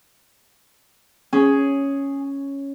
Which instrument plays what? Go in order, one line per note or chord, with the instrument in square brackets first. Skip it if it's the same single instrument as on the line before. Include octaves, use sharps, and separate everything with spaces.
[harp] C#4 [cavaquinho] G#4